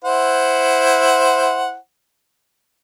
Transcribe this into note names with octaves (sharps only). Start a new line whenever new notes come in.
E4 C5 F#5